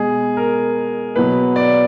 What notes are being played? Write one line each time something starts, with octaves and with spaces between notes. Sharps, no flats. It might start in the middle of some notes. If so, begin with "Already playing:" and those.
Already playing: B2 G#3 G#4
A#4
B2 F#3 B4
D5